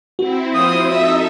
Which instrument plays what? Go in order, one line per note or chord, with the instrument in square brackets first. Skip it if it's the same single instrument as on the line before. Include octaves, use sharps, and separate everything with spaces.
[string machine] C4 E4 [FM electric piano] F#4
[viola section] F3 C5 [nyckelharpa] D#6
[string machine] D#4 A4 [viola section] E5